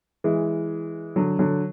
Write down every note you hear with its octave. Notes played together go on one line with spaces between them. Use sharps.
E3 G#3
D3 F#3
D3 F#3